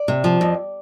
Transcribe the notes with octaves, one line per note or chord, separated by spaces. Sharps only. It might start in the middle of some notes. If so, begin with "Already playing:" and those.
Already playing: D5
C3
F3
F2